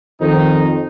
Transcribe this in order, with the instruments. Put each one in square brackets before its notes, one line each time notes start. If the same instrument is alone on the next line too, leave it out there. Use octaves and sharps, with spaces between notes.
[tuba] F2 [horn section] D#3 D#4